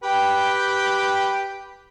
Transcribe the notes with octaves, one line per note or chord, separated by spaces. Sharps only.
G4 B4 G5